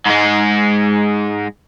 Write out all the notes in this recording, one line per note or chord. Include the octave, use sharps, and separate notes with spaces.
G#2 G#3